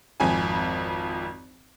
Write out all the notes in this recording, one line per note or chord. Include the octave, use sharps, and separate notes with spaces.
G#1 F2 G#5